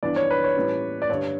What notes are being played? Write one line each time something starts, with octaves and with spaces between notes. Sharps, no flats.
G2 E3 B3 D4 D5
C#5
B4
C#5
A2 E3 G3 C#4
D5
G2 D3 G3 C#5